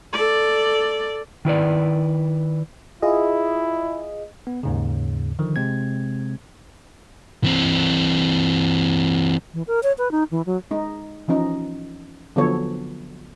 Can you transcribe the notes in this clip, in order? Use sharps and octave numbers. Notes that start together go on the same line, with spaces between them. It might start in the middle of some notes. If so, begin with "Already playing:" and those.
A4 D5
D#3 E4 B4 D5
E4 F4 G#4 D#5
B3
D#2 G#2 C#3
D3 D#3 F3
C3 G#3 C4 G#6
E3 C4
E3
A#4
C#5
B4
D#4
E3
F#3
G#3 D#4
E3 F3 C#4 D#4
D3 F3 F#3 B3 A4 C#5